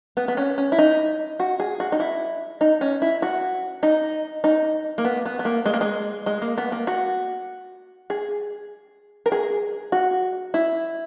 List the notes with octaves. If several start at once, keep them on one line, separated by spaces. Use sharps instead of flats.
B3
B3
C#4
C#4
E4
D#4
F#4
G#4
F#4
D#4
E4
D#4
C#4
E4
F#4
D#4
D#4
A#3
B3
B3
B3
A#3
G#3
A#3
G#3
G#3
A#3
B3
A#3
F#4
G#4
A#4
G#4
F#4
E4